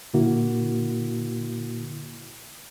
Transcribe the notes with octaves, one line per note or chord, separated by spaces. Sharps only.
A#2 D3 A#3 E4 F#4